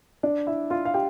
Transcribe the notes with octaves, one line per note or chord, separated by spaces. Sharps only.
D4 D5
E4 E5
F4 F5
F5
G4 G5